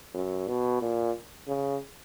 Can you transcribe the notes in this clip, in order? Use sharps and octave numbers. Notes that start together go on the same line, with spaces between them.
F#2
B2
A#2
C#3